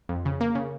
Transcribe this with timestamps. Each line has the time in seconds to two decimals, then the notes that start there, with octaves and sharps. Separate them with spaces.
0.09 F2
0.25 C#3
0.40 A#3
0.55 C#3